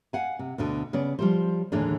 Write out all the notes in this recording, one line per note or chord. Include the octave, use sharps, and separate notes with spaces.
F5 F#5 G#5
C3
D2 B2 D3
C#3 B3 D5
F3 G3 C5
D#2 A2 D3 E3 G#3 D4